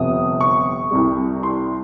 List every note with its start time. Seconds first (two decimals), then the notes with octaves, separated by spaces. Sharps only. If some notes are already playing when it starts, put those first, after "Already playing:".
Already playing: G1 F2 C3 F3 D#6
0.41 C#6
0.91 C2 C3 G3
1.43 C6